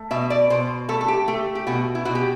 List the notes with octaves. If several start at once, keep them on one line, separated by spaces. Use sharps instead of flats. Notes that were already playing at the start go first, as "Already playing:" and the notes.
Already playing: A3
B2 E5
D5
B2 C5
A3 A4
A4
G4
A3 G4
G4
B2 F#4
E4
B2 F#4
G4